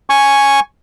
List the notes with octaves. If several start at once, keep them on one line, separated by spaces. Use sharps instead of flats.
G#5 C#6